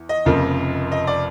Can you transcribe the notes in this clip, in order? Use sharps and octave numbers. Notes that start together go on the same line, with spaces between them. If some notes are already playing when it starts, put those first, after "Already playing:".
Already playing: E2
D#5
F1 F2 C#3 F3 A#3
D#5
D5